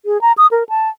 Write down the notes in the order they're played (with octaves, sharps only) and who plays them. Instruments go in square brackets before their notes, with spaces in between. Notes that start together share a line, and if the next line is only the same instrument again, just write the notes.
[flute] G#4
A#5
D#6
A#4
A5